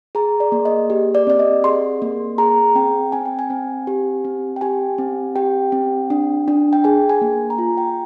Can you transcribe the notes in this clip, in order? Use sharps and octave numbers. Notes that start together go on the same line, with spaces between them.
G#4 A#5
D5
A#3
D#5
G4
D5
C4 D5
D#5
G#4 C6
A#3
G#4 A#5
C4 G5
C4 G#5
G5
G#5
C4
G4
C4
G5
G4 G#5
C4
G4 G5
C4
D4
D4
G5
G#4 G#5
G#5
A#3
A#5
F4 G#5
G5